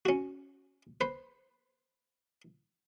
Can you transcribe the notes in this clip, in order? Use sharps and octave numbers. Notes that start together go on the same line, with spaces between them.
C#4 F#4
B4 C5